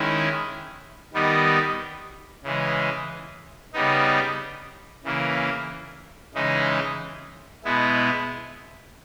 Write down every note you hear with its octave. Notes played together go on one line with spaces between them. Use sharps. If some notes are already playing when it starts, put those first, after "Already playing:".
Already playing: D#3 G#3 C#4 E4
D#3 G3 B3 D#4
C#3 E3 G#3
C#3 G3 B3 D#4
C#3 E3 A#3
C#3 E3 G#3 D#4
B2 G#3 B3 E4